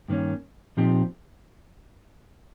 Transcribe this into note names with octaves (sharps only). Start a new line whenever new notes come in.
G2 D#3 A#3 C#4
A#2 F3 C4 D#4 G4